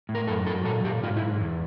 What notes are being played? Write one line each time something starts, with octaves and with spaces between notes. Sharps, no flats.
A2
A#4
F#2 A4
F#3 A4
A#2 A4
A#2 G4
G#2 F4
E4
G#2
E2